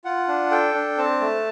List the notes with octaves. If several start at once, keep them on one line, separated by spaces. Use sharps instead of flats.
F4 F#5
D4
A4 G5
D4
C4 A5
A3